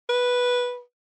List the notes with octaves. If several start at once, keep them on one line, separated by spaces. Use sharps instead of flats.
B4